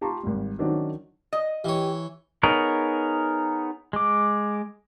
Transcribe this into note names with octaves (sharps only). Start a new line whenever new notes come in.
F4 G4 A5 A#5 C6 C#6
G#1 G3
D#3 F#3 C#4 D4 F#4 C5
D#5
E3 G4 C#5
B3 D#4 G#4 A#4 C#5
G#3 D6